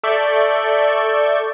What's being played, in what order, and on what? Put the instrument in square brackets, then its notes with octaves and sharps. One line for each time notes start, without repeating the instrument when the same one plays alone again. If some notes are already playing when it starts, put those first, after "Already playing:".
[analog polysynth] A4 D5 E5 C#6 G6